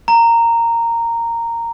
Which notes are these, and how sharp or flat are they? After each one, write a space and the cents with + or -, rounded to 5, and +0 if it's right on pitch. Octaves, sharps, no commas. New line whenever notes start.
A#5 -10